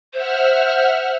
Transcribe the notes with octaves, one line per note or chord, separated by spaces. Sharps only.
C5 E5 F#5 F6